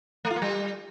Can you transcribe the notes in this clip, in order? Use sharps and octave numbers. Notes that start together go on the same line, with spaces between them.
A3
F4
A#3
G3